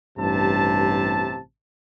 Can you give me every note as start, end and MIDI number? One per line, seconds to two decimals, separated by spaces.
0.18 1.40 33
0.18 1.40 43
0.18 1.40 48
0.18 1.40 81